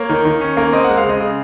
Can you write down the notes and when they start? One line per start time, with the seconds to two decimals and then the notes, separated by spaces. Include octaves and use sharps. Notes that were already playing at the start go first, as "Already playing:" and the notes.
Already playing: A#3 C#5
0.09 D#3
0.25 D#3
0.41 C#4
0.57 A#3
0.73 C4 D#5
0.84 G#3 F#5
0.97 F5
1.04 C#3
1.09 D#5
1.21 C#3